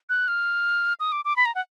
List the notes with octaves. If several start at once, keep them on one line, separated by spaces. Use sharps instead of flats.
F#6
F6
D#6
D6
D6
B5
A#5
F#5